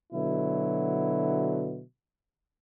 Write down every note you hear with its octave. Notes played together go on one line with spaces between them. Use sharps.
B2 D3 F#3 E4